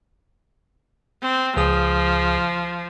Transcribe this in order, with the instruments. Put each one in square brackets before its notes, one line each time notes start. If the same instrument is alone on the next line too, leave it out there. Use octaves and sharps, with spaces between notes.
[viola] C4
[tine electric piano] C#2 G#4 D#6 [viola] F3